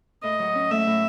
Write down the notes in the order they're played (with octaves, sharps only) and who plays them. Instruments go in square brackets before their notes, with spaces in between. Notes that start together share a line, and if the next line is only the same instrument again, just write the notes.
[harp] A2 [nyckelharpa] D#5
[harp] F#3
C#4
[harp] A3 [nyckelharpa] E5
[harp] A2